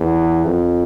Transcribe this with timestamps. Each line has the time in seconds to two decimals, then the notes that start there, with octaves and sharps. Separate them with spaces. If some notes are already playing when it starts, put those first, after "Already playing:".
Already playing: E2
0.45 F2